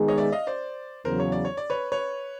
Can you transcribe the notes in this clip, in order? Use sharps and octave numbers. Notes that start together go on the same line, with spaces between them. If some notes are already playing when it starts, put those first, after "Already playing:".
Already playing: D#3 G#3 B3 D#4 G#4
C#5 D#5
D5 E5
D#5 F5
C5 D5
E2 C#3 F#3 A#4 C5
C#5
D5
C#5
D5
B4 C#5
B4 C#5